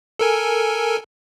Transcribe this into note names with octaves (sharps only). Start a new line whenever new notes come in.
A4 A#4 G#5